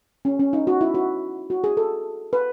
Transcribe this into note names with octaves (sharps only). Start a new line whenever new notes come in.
C#4
C#4
D#4
F#4
E4
F#4
F#4
G#4
A4
B4